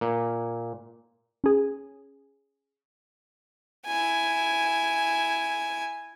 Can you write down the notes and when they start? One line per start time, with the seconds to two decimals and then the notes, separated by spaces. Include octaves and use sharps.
0.01 A#2
1.44 C#4 G#4
3.86 E4 G#5